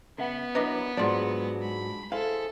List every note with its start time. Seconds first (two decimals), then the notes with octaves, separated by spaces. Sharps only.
0.18 C#3 B3 E5 F#5
0.55 F#3 D4 E4 A#4 B4 D#5
0.97 G#2 F#3 G#3 D4 F4 D5
1.62 B5
2.12 E4 G#4 A4 C5 F5